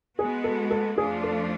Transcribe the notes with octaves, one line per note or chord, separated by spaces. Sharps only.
G#3 B3 F#4 G#4
A4
A4
F2 F3 A3 D4 F4 G#4
A4